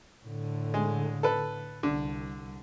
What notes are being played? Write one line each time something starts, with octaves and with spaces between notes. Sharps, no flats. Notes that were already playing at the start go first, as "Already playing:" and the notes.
A2 D3
G#3
A4 B4
C2 D3